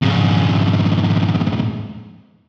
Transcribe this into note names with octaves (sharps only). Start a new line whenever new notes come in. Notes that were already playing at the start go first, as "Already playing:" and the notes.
F2 G#2